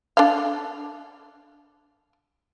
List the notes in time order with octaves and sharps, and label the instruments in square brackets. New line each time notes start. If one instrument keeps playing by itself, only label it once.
[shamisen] D4 A4 F5